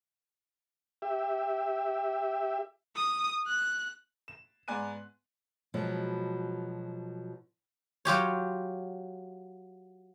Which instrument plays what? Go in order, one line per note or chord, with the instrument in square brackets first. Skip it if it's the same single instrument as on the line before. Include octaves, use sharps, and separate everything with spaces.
[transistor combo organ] G4 E5
[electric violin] D#6
F#6
[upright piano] E7
G#2 B3 D5 G#5 F#6 D#7
[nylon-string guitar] B2 F3 F#3 G#3 B3
[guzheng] F#3 F4 G4 C#5